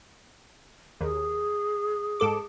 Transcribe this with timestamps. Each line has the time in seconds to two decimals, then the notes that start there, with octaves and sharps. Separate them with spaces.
1.01 D#2 G#4
2.20 G#2 A4 D6